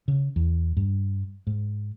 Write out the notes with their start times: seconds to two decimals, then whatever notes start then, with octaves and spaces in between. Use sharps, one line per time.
0.08 C#3
0.36 E2
0.77 G2
1.47 G#2